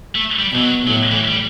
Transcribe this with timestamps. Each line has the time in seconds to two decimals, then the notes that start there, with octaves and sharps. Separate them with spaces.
0.15 A3
0.39 G3
0.51 B2 E3
0.64 F#3
0.88 A2 F#3
1.11 E3
1.28 G3